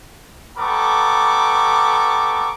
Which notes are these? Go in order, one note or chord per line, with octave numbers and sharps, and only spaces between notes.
G3 B3 A4 A#5 C#6 D6